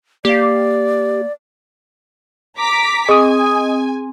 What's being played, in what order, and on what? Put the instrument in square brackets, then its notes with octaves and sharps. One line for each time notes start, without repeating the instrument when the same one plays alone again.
[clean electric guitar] A#3 F5 [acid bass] G4 [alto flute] D5
[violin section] A#5 D6 B6
[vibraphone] C4 [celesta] G#4 [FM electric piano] D#5 D#6 [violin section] G#5